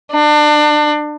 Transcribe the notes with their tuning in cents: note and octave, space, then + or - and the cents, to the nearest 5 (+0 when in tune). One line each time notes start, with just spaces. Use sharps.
D4 +30